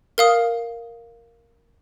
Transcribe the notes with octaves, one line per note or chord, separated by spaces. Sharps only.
A#4 F5 D#6